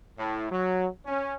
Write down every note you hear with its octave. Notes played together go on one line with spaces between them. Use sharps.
A2
F#3
C#4